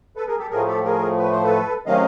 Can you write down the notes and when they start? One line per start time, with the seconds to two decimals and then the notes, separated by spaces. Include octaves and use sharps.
0.16 A4 B4
0.28 G#4 A#4
0.39 G4 A4
0.50 A2 F3 A3 G#4 A#4
0.67 G4 A4
0.84 G#4 A#4
1.18 B4
1.31 C5
1.44 A4 B4
1.86 C3 D#3 F#3 A3 C#4 D#5 F5